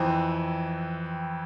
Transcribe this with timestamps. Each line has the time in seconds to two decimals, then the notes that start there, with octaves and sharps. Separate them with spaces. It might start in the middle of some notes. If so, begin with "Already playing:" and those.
Already playing: F2 E3 C4